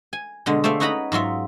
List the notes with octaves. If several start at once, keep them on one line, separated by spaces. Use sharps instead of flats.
G#5
B2 D3 G#3
A3 C5 D5 E5 F5
C#4 D#4 F#4 B4 A#5 B5
G#2 F#3 F4 E5